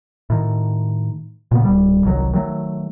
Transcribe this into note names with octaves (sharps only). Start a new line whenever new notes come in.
A2 D#3
A#2 C#3 B3
D1 G3
G1 C2 D#3 F#3
D#3 F#3 A3